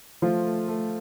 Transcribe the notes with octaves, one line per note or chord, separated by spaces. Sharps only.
F3 A3 F4
A3
A3